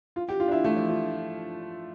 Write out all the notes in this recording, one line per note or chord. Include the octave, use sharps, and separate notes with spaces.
F4
G4
F4
D4
E4
A3
F3
F3